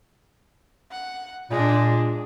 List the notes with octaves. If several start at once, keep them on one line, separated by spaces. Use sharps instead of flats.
F#5
A#2 G#3 D4